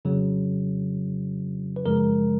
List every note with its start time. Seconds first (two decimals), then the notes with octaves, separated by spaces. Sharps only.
0.05 F2 C#3 F#3
1.76 B4
1.86 F#2 C#3 F3 G#3 A#4